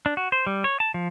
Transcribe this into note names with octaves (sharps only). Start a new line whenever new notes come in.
D4
F#4
C5
G3
C#5
A5
F3